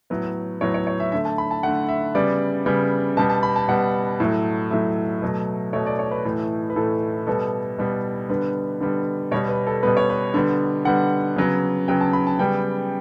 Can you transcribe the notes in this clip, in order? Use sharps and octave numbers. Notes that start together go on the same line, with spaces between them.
A2 F#3 B3
A2 F#3 B3 C#5
C#5
C#5
E5
D3 A3 E5
A5
B5
A5
D3 A3 F#5
E5
C#3 G3 B3 D5
C#3 G3 B3
B2 G3 B3 A5
A5
B5
A5
B2 G3 B3 F#5
A2 F#3 A3
A2 F#3 A3 E5
B2 F#3 A3
B2 F#3 A3 C#5
D5
C#5
B4
A2 E3 A3
B4
A2 E3 A3 A4
B2 G3 B3 A4
B2 G3 B3
D3 G3 B3 B4
D3 G3 B3
B2 G3 B3 C#5
B4
A4
B2 G3 B3 B4
C#5
B4
D3 G3 B3
D3 G3 B3 F#5
C#3 F#3 B3
C#3 F#3 B3 G5
A5
B5
A5
C#3 G3 B3 G5